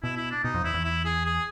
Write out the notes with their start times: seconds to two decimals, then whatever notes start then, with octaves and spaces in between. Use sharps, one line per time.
0.03 B2 E4
0.17 E4
0.31 D4
0.44 B2 D#4
0.54 F2
0.64 E2 E4
0.74 E2
0.84 E4
1.05 G#4
1.25 G#4